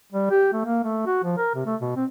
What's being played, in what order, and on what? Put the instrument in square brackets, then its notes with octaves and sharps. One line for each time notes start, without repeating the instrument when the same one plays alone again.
[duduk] G3
G4
A3
A#3
A3
F#4
F3
A#4
C3
A3
B2
C4